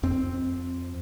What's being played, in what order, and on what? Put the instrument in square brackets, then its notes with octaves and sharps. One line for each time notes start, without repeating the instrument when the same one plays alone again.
[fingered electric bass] F2 C4